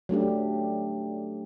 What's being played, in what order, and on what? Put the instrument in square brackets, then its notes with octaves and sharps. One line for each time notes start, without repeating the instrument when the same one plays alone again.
[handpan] F#3 A3 D4 G4